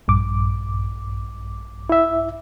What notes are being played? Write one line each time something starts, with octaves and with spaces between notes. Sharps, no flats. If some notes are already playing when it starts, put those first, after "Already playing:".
A#1 G2 D6
E4 E5